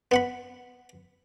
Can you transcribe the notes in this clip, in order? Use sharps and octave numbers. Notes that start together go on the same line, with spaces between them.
B3 F#5 B5